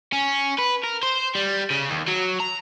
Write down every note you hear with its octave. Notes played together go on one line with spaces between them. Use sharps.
C#4
B4
A#4
C5
G3
C#3
D#2
F#3
A#5